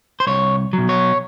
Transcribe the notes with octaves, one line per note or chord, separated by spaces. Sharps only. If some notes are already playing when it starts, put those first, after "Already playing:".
C5
C2 C#5
B2 F#3
C#5